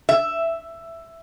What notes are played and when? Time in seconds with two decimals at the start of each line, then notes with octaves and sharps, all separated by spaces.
0.09 E5